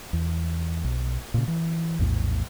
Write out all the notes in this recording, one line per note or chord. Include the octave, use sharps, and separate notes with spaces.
E2
B1
A#2 C#3
E3
A#1 E2 A2